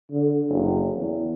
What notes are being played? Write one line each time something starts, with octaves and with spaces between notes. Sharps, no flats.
D3
F#1
E2